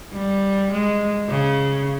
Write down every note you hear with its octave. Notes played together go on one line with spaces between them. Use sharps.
G3
G#3
C#3